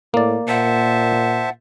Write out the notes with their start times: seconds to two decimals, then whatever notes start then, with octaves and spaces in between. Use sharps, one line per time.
0.14 A2 A#3 D5
0.48 A#2 C5 E5 F#5 A5